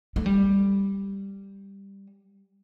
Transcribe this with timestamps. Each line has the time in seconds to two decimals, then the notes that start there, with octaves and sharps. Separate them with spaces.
0.16 A3
0.26 G3